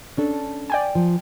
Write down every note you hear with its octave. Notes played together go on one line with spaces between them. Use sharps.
C#4 D4 A4
D5 G5 G#5
F3